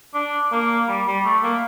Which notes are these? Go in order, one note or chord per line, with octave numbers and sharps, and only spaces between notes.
D4
A#3
G3
G3
A3
A#3